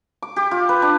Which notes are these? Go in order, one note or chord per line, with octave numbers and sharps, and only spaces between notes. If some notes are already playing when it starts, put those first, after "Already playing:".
D6
G4
F4
B4
D4